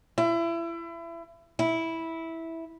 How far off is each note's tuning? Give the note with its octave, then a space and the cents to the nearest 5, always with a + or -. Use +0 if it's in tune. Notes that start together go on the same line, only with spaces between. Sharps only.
E4 +30
E4 -10